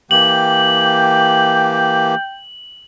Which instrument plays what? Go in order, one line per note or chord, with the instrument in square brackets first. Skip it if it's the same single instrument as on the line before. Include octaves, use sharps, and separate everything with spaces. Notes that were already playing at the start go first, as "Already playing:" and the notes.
[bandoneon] E3 A#3 G4 [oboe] G5 [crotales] F#7